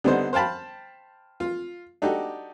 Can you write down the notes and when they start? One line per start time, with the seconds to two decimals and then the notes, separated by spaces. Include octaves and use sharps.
0.04 D3 G3 B3 D#4 C5
0.33 C5 F5 G5 A5 B5
1.40 F4
2.02 D4 D#4 F#4 G4 A4